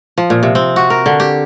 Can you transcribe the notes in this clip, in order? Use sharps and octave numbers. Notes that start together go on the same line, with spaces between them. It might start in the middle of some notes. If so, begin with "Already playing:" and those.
F3
A#2
C3
C4
F#4
A#4
D3
G4